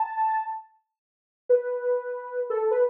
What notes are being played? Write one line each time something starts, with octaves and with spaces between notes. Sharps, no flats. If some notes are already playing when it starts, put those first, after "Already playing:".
Already playing: A5
B4
A4
B4